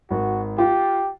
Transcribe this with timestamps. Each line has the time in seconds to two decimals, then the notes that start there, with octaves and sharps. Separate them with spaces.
0.11 G#1 F#4
0.58 F4 G4